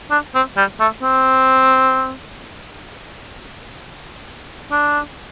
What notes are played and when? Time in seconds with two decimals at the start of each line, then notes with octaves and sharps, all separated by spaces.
0.11 D4
0.35 C4
0.57 G3
0.80 A3
1.03 C4
4.72 D4